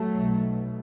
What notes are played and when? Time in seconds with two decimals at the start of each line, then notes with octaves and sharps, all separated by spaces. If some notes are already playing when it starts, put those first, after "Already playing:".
Already playing: F#3 A3
0.10 B1 B2